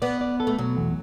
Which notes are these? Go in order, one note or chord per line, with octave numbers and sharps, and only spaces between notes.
B3 D5
D5
A4
A3
B2 F#3
E2